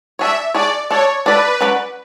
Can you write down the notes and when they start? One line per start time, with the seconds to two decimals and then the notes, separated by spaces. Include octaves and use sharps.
0.19 D4 G#4 C#5 E5
0.54 D4 G#4 C#5 D5
0.90 D4 A4 C#5 D5
1.26 D4 A4 B4 D5
1.61 F#3 C#4 F#4 B4 D5